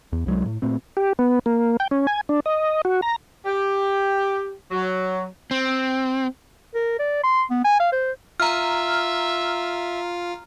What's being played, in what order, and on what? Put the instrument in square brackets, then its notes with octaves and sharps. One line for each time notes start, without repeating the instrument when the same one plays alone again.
[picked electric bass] E2
C2 F#3 G#3
A2
A#2 A3 C4
[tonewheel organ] G4
B3
A#3
G5
C#4
G#5
D4
D#5
F#4
A#5
[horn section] G4
F#3
[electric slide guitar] C4
[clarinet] A#4
D5
C6
B3
G#5
F5
C5
[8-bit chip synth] F4 [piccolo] E5 [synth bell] A#5 F6